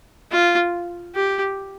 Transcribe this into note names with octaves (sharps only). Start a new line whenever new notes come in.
F4
G4